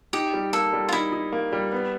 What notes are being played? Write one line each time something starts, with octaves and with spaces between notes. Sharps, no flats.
D#4 G4
G3
A#3 A4
G3
F4
D#4 E4
D#4
A#3
G3
B3